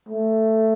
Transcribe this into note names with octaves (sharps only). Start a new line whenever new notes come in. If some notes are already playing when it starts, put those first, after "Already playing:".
A3